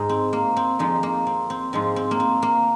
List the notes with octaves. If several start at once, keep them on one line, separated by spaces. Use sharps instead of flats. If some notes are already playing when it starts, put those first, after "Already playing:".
Already playing: G#2 G#3 D#4
C4
A#3
C4
F2 F3 G#3 D#4
A#3
C4
C4
G#2 F3 G#3 C4
C4
A#3
C4
A#3